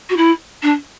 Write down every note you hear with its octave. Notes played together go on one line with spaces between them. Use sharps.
F#4
E4
D4